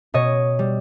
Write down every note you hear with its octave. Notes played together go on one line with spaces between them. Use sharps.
B2 C#5 D#5
G3